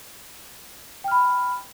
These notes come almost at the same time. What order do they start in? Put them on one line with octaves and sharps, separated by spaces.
G5 F6 B5